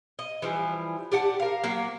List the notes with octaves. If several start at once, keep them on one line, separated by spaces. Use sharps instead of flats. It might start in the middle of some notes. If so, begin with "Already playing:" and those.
D#5
E3 F3 G3
G4 D5 F#5 A5
A#4 F5
F#3 A#3